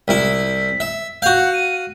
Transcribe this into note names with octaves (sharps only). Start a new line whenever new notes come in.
C2 E4 B6
E5
F#4 F5 G6
F#5
D#7